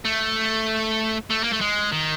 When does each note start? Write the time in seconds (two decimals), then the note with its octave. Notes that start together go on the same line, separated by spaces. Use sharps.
0.05 A3
1.30 A3
1.43 A#3
1.52 A3
1.61 G#3
1.92 D#3